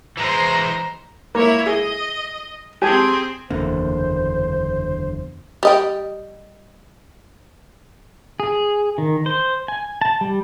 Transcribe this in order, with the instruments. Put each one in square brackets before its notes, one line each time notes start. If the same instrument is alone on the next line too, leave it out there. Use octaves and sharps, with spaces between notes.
[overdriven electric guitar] E3 G#3 [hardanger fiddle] C5 A#5
[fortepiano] A#3 [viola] E4 C#5
[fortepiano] G#4 [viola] D#5
[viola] C4 G#4 [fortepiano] G4 G#5 A5
[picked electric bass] F#1 E2 [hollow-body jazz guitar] D3 A#3 [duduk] C5
[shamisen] G3 D#5 G5
[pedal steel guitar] G#4
D#3
C5
G#5
A5
G3